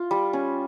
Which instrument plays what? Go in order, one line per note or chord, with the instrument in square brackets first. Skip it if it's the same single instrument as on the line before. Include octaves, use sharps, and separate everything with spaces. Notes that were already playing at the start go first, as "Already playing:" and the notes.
Already playing: [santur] F4
G3
C#4